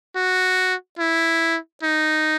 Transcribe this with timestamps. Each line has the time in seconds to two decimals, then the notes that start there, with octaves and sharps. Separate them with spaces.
0.16 F#4
0.99 E4
1.83 D#4